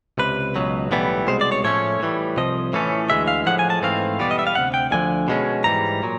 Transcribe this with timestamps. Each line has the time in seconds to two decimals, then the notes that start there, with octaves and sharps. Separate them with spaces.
0.18 C#2 C3 B4
0.56 C#2 B2 F#3
0.91 B1 A2 E3 G3 B3
1.27 C2 B2 G#3 C5
1.41 D5
1.52 C#5
1.64 A2 F3 A3 C#4 C#5
2.00 A2 E3 G3
2.37 C2 C3 F3 D#5
2.73 A2 E3 A3 C#4
3.10 D2 C#3 E3 G#3 E5
3.28 F5
3.46 A2 F3 G#3 F#5
3.59 G#5
3.70 A5
3.82 G#2 E3 A3 C4 F5
4.19 E2 B2 G3 B3 D5
4.31 D#5
4.39 E5
4.47 F5
4.55 D2 C3 F#5
4.74 G5
4.91 D2 D3 F3 G#5
5.28 B2 G#3 C#4
5.64 G#2 E3 G3 A#5
6.03 A#2 F#3